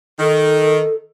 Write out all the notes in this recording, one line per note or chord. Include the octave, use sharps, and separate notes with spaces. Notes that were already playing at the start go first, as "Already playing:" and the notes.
D#3 A4